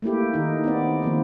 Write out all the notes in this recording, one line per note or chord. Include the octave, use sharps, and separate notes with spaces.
A3 A#3 E4 G4
D#3 D#4
B3 C4 D5
D#3 F3 A#3 C4